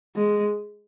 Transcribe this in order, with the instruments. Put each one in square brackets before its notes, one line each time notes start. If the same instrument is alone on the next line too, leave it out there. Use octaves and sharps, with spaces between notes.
[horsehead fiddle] G#3